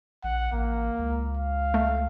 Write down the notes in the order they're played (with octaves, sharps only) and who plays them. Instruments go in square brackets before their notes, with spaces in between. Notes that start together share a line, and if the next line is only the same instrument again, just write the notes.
[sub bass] A#1 [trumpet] F#5
[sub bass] A1 [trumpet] A#3
[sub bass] C#2
[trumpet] F5
[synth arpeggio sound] A3